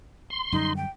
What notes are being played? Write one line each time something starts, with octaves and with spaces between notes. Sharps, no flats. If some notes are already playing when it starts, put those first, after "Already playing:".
C6
F#2 D3 G3 D#4
G5